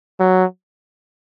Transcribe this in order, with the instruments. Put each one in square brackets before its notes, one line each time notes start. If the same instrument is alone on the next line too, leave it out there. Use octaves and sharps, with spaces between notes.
[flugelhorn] F#3